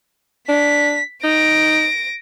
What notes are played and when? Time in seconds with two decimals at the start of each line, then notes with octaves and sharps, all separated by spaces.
0.49 D4 B6
1.24 D#4 A#6 D7